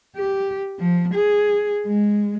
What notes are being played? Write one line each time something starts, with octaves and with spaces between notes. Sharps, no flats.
G4
F3
G#4
G#3